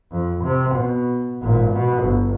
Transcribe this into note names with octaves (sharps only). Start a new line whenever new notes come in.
F2
C3
B2
G#1 A#2
B2 B3
G1